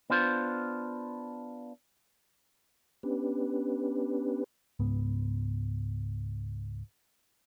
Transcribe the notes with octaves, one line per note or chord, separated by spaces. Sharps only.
B3 D4 F4 C5
B3 C#4 D4 G4 B4
C#2 G#2 B3